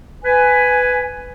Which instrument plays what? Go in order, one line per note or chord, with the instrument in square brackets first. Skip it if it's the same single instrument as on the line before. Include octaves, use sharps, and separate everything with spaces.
[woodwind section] B4 G#5